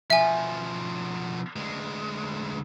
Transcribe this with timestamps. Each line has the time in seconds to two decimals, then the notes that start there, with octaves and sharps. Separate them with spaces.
0.10 B2 F3 E5 G#5
1.56 D2 G#3